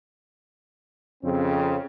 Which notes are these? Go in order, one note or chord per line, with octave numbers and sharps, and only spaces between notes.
F2 C#3 C4